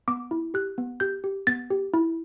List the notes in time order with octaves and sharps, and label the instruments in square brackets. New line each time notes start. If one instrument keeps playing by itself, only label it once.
[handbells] B3 D6
E4
G4 F#6
B3
G4 G6
G4
B3 A6
G4
E4